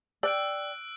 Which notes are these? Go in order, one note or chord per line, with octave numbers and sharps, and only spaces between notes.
D5 G5 E6 F#6 D7